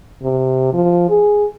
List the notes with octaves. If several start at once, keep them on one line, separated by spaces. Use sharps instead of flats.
C3
F3
G#4